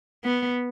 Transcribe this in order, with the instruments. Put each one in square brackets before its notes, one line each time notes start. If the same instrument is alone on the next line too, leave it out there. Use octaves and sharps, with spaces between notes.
[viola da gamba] B3